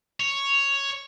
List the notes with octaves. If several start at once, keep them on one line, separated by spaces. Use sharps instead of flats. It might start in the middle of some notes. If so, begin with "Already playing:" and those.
C#5